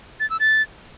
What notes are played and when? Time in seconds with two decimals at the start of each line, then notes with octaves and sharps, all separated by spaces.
0.20 A6
0.30 E6
0.40 A6